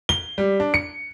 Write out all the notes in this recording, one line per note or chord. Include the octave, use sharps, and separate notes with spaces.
G7
G3
D4
C#7